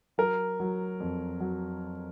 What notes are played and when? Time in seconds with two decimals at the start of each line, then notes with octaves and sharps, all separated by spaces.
0.18 F#3 A#4
0.60 F#3
1.00 F2
1.40 F#3